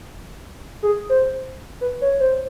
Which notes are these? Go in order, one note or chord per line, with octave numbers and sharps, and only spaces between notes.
G#4
C5
B4
C#5
C5